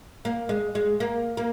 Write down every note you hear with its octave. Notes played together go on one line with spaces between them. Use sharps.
A#3
G#3
G#3
A#3
A#3